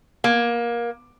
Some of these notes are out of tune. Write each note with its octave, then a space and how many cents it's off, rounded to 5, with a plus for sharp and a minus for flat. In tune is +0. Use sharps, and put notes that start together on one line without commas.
A#3 +20